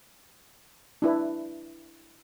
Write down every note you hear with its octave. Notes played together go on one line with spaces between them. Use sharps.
D4 E4 B4